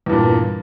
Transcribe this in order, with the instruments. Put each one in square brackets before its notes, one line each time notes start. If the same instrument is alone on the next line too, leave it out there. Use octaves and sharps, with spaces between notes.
[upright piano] E2
G2
A#2